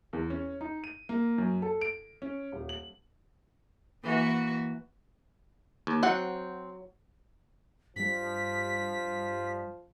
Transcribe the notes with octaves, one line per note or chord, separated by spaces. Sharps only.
E2
C#4
D#4
D#7
A#3
F#2
A4
D7
C#4
D#1
F#7
E3 A#3 F#4
D#2
F#3 C4 F#5
G2 F3 G3 B6